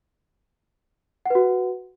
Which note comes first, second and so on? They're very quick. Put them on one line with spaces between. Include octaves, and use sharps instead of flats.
F#5 B4 F#4